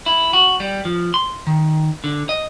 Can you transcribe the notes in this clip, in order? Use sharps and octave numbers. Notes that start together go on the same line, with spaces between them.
E4
F#4
G3
F3
C6
D#3
D3
D#5